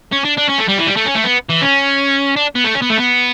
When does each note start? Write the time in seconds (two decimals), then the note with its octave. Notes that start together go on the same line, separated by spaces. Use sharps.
0.13 C#4
0.25 D4
0.38 D4
0.50 C#4
0.59 A3
0.69 G3
0.79 E3
0.87 G3
0.97 A3
1.06 C#4
1.15 A3
1.25 B3
1.50 E3
1.62 C#4
2.36 D4
2.55 B3
2.64 A3
2.75 C#4
2.82 B3
2.90 A3
2.98 B3